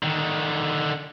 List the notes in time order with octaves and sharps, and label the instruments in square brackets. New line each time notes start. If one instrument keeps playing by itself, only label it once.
[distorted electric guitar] D3 D#3